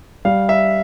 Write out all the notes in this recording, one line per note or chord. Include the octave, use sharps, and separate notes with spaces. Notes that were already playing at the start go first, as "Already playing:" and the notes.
G3 F5
E5